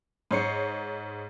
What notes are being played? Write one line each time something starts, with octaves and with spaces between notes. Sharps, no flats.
G#2 C5 C#5 C7 C#7